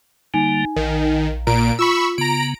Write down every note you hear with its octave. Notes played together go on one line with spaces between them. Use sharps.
D3 G3 A#3 D#4 G#5
A#1 D#3
A#2 A#5 D7
F4 B5 C#6 E6
C#3 B3 A#5 D7